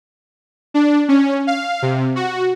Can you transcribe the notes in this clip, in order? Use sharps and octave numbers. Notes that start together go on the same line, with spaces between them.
D4
C#4
F5
C3
F#4